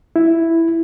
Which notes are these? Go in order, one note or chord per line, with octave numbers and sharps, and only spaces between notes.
E4